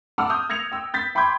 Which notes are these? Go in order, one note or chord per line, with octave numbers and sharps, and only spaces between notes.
F#5 A5 D6 E6 F6
D#6 G6
E6 G#6 A#6 C#7 F7
G5 E6
G6 A6 B6
G5 B5 C6 D6 G6 G#6